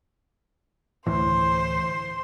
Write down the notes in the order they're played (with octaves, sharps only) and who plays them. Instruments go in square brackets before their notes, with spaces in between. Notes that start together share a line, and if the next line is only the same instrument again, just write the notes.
[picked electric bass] D2 A2 E3 [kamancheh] C5 C6